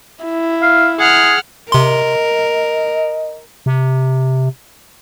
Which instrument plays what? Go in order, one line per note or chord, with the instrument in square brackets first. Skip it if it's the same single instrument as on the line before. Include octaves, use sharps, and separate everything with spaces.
[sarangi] E4
[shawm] F5
[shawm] G#4 [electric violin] F#5 F6
[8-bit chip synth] C3 C6 [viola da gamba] A#4 [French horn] D#5
[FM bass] C3